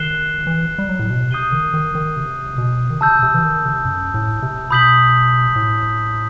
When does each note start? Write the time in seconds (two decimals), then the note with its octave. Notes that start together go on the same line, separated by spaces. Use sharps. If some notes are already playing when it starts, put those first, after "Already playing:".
Already playing: D#3 F#6 C7 E7 G7
0.47 E3
0.78 G3
0.89 F#3
0.99 A2
1.10 B2
1.31 C3 D#6 G6 C7 D#7 G7
1.52 D#3
1.74 D#3
1.95 D#3
2.17 C3
2.58 B2
2.90 D#3
3.01 C3 A5 E6 G6
3.23 C3
3.34 E3
3.43 D#3
3.65 C3
3.85 F#2
4.14 A2
4.42 C3
4.71 B2 B5 D#6 G6 B6 F#7
5.56 A2